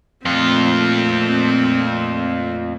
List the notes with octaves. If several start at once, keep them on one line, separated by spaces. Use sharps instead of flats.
F2 A#2 A3 C4 F4